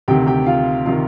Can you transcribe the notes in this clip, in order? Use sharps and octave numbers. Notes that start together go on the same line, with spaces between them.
D2 C3 D#3 G4 G5
G4 G5
F4 F5
C3 D#3 F4 F5